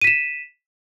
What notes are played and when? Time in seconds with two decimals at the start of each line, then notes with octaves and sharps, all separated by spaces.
0.01 D#7
0.04 B6
0.07 E7